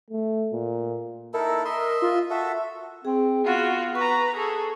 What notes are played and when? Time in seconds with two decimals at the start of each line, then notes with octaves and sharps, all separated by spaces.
0.11 A3
0.52 A#2
1.34 D#4 E4 A4 A#4
1.65 A#4 D#5 E5 C6
2.02 F4
2.30 F#4 A4 E5
3.05 C4 G#4
3.44 B3 F4 F#4
3.95 B4 A#5 C#6
4.37 G#4 A4